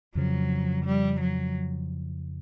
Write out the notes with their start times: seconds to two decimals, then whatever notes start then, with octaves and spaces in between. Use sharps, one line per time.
0.15 F2 C#3 F3 F#3
0.85 G3
1.21 F#3